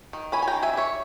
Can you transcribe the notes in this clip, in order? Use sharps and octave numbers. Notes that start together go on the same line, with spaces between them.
D#3
C#4 G#5 B5
G#5
G5 A#5
D#3
E5 G#5
G3 C#5 E5